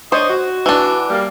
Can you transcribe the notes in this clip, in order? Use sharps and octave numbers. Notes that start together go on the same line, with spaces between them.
D4 C5 C#5 D#5
F#4
E3 D4
G3 A#3